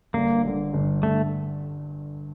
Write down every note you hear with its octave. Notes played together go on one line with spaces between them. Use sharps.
G1 G2 D3 A#3
G1 G2 D3
G1 G2 D3
G1 G2 D3 A3